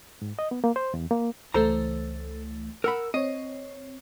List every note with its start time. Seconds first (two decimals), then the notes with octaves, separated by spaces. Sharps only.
0.22 G#2
0.39 D#5
0.51 B3
0.64 A#3
0.76 C5
0.94 E2
1.11 A#3
1.54 C#2 E3 A3 A4 C5 A#5
2.84 A#4 F#5 B5 E6
3.14 C4 C#5 D#5